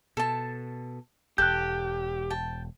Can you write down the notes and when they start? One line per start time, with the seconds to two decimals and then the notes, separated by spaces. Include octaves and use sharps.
0.17 B2 A4 A5
1.38 E1 G4 A4 F#6 G6
2.30 G5 A5